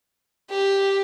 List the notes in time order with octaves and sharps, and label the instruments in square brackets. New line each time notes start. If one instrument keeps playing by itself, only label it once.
[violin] G4